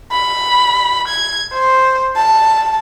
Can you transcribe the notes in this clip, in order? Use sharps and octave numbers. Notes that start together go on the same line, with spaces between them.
B5
G#6
C5
A5